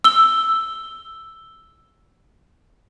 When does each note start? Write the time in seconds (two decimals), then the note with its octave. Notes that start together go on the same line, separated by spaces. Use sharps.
0.04 E6 G7